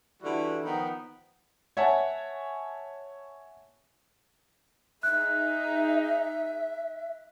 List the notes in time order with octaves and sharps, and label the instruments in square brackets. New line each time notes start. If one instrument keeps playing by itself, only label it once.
[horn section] D3 E3 G3 E4 F#4
D#3 F3 B3 D#4
[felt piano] C#5 E5 F#5 G#5 A5
[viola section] D#4 G#4 [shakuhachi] E5 [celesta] F#6